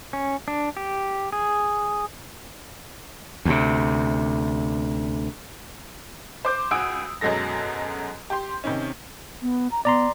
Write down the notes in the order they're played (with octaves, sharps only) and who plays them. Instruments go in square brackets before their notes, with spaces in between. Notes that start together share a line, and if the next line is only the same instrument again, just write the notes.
[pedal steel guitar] C#4
D4
G4
G#4
[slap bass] D2 C3
[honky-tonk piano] C5 D6 G6
C#2 F#4 G#5 D#6 E6 D7
F#2 B2 F#3 G#3 A4 A#6
G4 C6
C3 D#3 C#4
[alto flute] B3
A#5
[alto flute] B3 [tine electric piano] D5 A#5 C6